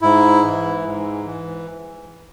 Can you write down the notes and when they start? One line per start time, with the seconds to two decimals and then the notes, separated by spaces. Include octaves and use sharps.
0.02 G#2 E4
0.43 E3
0.85 G#2
1.25 E3